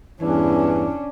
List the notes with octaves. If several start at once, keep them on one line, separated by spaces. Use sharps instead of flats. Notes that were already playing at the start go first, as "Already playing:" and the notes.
E2 G2 E3 C#4 D4